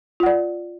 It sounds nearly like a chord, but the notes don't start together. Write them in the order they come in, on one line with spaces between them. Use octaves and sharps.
F4 F#5 D5